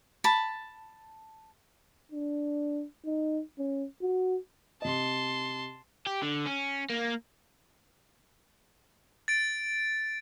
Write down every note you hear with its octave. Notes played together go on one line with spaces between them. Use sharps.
A5 B5
D4
D#4
C#4
F#4
C3 D#5 A5 C6
G4
D3
C#4
A#3
A6 D7